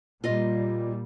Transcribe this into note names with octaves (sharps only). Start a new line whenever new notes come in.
A#2 G3 A#3 F4 D#5